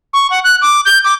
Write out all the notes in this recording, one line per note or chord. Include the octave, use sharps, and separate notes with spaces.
C#6
F#5
F#6
D6
G6
D6